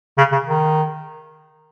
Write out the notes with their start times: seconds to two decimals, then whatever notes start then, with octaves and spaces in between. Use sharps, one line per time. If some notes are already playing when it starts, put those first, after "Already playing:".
0.18 C#3
0.32 C#3
0.47 D#3